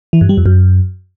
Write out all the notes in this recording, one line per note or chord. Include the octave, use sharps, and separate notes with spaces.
E3
G2
G3
F2
F#2